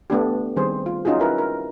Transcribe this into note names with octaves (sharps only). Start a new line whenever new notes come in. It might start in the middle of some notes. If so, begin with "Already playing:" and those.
A3 B3 D4 G4
D#3 G3 C4 G#4 C5
F4
C#4 D#4 F4 F#4 G#4
E4 A#4 B4
A#4